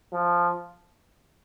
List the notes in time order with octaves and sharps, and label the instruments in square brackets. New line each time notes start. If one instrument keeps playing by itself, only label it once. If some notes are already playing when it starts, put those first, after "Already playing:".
[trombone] F3